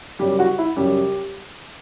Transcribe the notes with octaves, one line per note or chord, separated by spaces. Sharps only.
F#2 C#3 G3 G4
F#4
E4
F#2 C#3 G3 G4